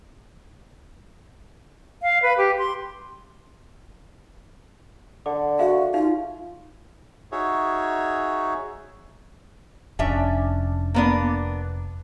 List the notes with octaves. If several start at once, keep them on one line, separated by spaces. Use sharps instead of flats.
F5
B4
G4
C6
D3 D6
F#4 G#4 E5 F5
D#4 F4 F5
D#4 F#4 G#4 C#5 E5
F1 C#4 D4 E5
A#3 B3 D4